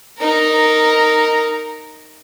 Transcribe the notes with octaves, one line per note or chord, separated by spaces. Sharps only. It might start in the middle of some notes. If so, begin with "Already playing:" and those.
D#4 A#4